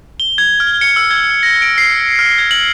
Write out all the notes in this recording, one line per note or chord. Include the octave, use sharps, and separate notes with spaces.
G7
G#6
F6
C#7
E6
G#6
A#6
D7
C7
F6
G#6
F#7